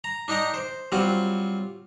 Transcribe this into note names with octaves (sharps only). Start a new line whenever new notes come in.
A#5
D4 D#4 D#5 G5 A#5
C5
F#3 G3 C4 F4